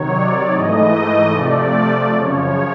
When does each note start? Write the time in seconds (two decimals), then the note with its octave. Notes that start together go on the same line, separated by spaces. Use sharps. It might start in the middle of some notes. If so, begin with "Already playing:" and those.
Already playing: C3 D#3 F#3 C#5
0.12 D5
0.51 G#2 E3 A3 D#5
0.92 D#5
1.32 C3 F3 A3 D5
2.14 F#2 C#3 F3 C#5